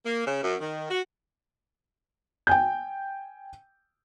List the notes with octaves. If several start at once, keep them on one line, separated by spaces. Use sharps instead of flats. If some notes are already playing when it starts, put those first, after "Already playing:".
A#3
C#3
F#2
D#3
F#4
G5 G#5 G6